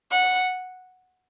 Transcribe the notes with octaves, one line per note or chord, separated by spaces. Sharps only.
F#5